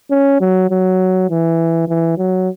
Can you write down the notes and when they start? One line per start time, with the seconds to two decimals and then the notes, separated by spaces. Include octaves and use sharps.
0.11 C#4
0.41 F#3
0.70 F#3
1.30 E3
1.88 E3
2.18 F#3